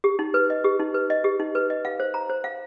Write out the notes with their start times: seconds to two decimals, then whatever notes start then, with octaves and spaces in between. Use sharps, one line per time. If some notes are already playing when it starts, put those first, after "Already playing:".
0.04 G4
0.19 D#4
0.34 B4
0.50 D#5
0.64 G4
0.79 D#4
0.94 B4
1.10 D#5
1.24 G4
1.40 D#4
1.55 B4
1.70 D#5
1.85 F5
2.00 C5
2.14 A#5
2.29 C5
2.44 F5